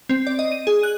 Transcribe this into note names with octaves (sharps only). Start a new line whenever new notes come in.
C4
D5
D#5
D#7
G#4
F#6